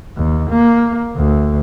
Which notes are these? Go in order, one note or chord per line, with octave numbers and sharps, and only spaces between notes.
D#2
A#3
D2